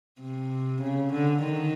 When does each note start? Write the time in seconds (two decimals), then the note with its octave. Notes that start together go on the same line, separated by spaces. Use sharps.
0.21 C3
0.82 C#3
1.13 D3
1.44 D#3